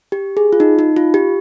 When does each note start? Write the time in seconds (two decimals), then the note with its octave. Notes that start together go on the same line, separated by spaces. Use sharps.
0.12 G4
0.37 G#4
0.53 F4
0.60 D#4
0.79 D#4
0.96 F4
1.14 G4